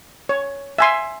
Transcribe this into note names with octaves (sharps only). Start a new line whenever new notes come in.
C#5
E5 G#5 C6